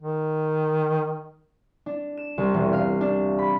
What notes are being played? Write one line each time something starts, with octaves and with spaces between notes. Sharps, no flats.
D#3
D4
E7
C2
E1
F5
D4
B5